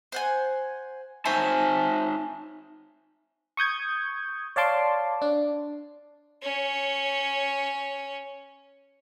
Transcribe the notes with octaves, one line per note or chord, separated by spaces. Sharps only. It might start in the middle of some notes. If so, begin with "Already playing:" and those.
C5 F#5 G#5
D#4 C5 C#5 E5 G#5 A5
C#6 D#6 G6 G#6
C#5 D5 F5 A5 C6 D6
D4
C#4 C#5